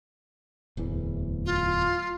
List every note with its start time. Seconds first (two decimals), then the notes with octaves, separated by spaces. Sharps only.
0.77 D1 E2 E3
1.46 F4